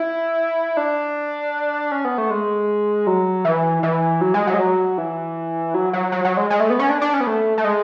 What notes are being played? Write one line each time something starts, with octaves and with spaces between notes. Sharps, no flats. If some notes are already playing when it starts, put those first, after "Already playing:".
Already playing: E4
D4
C#4
B3
A3
G#3
F#3
E3
E3
F#3
G#3
F#3
G#3
F#3
E3
F#3
F#3
F#3
F#3
G#3
G#3
A3
B3
C#4
D4
D4
C#4
B3
A3
A3
G#3